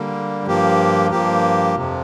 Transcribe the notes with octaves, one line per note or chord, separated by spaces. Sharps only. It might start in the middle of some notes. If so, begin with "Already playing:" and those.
Already playing: D3 G3 A#3
G2 F3 A#3 G4
G2 F3 A#3 G4
F2 C3 F3